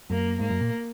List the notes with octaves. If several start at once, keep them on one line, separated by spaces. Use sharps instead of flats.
F#2 A#3
G#2 A#3
F#2
A#2